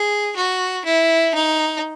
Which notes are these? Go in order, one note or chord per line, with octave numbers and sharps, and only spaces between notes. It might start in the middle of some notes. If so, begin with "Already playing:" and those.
Already playing: G#4
F#4
E4
D#4